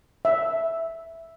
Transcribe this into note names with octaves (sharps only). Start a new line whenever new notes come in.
E5